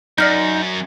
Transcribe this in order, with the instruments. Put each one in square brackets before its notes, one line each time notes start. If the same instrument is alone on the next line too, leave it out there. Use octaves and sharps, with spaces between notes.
[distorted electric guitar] F#2 [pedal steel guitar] D#4 [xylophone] D5 F6 G6